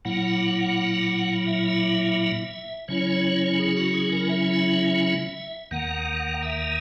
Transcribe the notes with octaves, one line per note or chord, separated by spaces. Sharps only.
A#2 F#3 A#3 E4 F#5
E5
C#3 F#3 C#4 E4 C#5
G#4
F#4
G#4
A#4
E5
D#2 D#3 A#3 F#5
E5